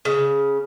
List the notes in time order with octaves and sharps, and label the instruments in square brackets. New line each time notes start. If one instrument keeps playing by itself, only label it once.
[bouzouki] C#3